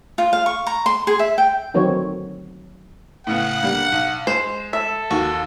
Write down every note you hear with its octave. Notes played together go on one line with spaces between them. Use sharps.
F4
F5
C#6
A#5
C6
G#4
E5
G5
D3 D#3 F#3 C4 C#5
A2 C#3 B3 F#5
D3 G3 A#3
B1
G#3 C5 E7
A4 E5
D#2 F#4